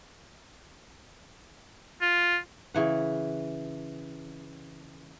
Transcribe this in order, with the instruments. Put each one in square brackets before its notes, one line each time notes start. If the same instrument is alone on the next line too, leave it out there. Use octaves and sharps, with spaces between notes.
[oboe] F4
[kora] C#3 E3 F#5